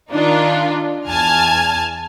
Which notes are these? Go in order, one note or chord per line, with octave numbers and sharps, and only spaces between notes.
D#3 D4 D#4 F4
E2 G#5 A5 F6 G#6